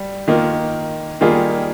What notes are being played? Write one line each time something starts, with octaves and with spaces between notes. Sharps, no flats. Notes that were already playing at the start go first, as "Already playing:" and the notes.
Already playing: G3
D#3 A#3 F4
D#3 G3 A#3 F4 G#4